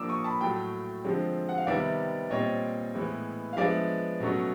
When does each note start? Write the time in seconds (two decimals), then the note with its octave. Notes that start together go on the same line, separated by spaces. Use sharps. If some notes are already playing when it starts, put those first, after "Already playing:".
Already playing: F3 A#3 D4 D6 E6
0.09 C#6 D#6
0.24 A5 B5
0.41 A2 F#3 A3 G5 A5
1.05 D3 F3 G#3 C4
1.49 F#5
1.58 F5
1.67 C3 D#3 G3 B3 D5 E5
2.30 A#2 G3 C4 C#5 D#5
2.95 A2 E3 G#3 B3
3.53 F5
3.57 F3 G#3 B3 D4 D5 E5
4.20 B2 F#3 A3 C#4